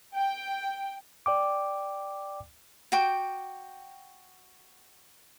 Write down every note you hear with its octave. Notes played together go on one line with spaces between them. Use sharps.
G5
D5 G5 D6
F#4 G5 D6